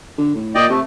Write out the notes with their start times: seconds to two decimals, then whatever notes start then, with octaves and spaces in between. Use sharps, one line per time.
0.18 D3
0.35 A2
0.55 A#2 D5 D#5 G5
0.70 C3 A3